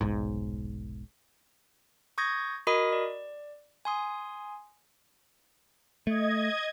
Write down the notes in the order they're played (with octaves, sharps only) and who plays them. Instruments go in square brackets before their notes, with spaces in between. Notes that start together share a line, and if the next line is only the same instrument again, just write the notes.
[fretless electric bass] F1 B1 G#2
[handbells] C#6 D#6 G6 G#6 A#6
F#4 A#4 D#5 B5 D#6
D5
G#5 C6 D#6
[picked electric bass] A3 [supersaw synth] D#5 G#6